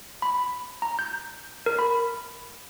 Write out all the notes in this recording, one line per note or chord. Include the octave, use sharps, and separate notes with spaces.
B5
A#5
G6
A#4
B5